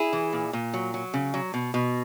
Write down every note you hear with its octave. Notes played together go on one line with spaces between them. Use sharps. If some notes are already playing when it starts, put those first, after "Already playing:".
Already playing: E4 G#4
E3
A#2
A#2
F#3
F#3
C#3
F#3
B2
B2